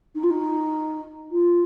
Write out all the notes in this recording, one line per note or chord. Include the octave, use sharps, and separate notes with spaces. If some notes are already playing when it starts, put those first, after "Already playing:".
D#4
F4
D#4
F4